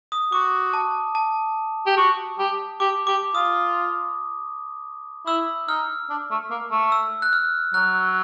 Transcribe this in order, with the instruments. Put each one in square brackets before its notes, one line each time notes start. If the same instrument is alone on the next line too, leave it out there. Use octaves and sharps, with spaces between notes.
[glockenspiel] D#6
[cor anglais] F#4 [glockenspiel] D6
[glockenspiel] A5
A5
[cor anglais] G4
F#4
G4
[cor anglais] G4 [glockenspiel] D6
[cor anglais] G4 [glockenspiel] D6
[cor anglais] F4 [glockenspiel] D#6
[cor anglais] E4 [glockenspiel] E6
[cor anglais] D#4 [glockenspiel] F6
[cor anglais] D4
A3
A#3
A3
[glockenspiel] E6
F#6
F6
[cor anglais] F#3 [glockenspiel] F#6